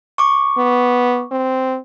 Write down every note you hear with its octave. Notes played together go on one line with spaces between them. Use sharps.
C#6 D6
B3
C4